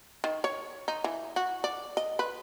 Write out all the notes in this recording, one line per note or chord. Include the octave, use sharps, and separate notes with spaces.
D#3
C#5
D#4
E3
F#4
D5
D#5
B4